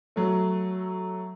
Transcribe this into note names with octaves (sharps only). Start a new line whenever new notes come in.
F#3 A3